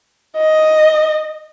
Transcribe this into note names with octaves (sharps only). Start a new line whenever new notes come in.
D#5